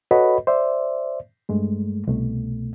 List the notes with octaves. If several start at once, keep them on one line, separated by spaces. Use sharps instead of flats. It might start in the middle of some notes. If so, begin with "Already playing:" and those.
F#4 A4 B4 C#5 D#5 B5
C5 D5 E5
G2 G#3 A3
C2 B2 A3